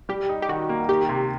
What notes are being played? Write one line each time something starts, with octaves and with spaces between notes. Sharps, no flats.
G3 G4
D#4
G4
D#3 F#4
A#3
D#3 G4
C3